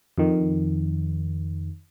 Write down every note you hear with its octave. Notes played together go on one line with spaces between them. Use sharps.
F2 D#3